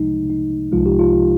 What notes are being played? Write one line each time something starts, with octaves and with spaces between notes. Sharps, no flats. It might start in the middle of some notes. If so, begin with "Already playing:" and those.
Already playing: C2 C3 F3 G#3 D#4
D#4
C2 C3 F3 G#3 F4
G4
F4